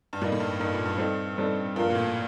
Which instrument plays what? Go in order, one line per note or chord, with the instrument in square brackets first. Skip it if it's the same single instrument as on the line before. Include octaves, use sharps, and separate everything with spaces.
[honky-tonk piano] G2
[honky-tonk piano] A2 [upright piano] G3 A#3 D#4
[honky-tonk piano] A2
G2
[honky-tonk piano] G2 [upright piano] G3 A#3 D#4
[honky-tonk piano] A#2
G2
[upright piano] G3 C4 D#4 A4
G3 C4 D#4 A4
[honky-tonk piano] G2 [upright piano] F3 A#3 F4 A#4
[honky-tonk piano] A#2
A2